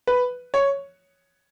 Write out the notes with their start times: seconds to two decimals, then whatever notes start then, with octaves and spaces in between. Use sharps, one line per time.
0.07 B4
0.54 C#5